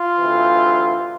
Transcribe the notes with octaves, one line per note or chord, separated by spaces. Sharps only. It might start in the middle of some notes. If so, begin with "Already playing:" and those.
Already playing: F4
D2 C3 E3